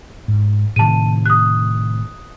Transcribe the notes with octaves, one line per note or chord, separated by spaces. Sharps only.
G#2
A2 C3 D#3 A5 D#7
D#6 F#6